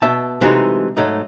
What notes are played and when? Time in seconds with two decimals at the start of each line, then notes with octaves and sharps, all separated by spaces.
0.02 B2 E5 A5
0.41 C3 E3 F#3 G#3 A3 D#4
0.97 G#2 F#3 A3 D#4